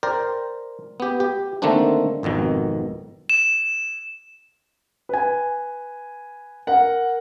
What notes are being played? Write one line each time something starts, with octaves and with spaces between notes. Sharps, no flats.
A#4 C5 D5 G5
B3 G4
G4
D3 D#3 A3 A#3 C4 D4
G#1 F2 B2 D#3
E7
B4 G#5
A#4 F#5